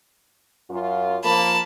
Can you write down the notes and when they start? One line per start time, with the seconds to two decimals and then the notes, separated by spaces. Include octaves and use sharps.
0.70 F#2 F4
1.24 F3 A#3 A5 B5